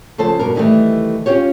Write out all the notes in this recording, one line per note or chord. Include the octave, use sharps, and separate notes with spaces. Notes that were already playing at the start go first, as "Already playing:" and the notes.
C#3 F3 A4 C5 A5
G2 B2 A#4
C3 D#3 E3 G3 A3
C#4 F4 G4 C#5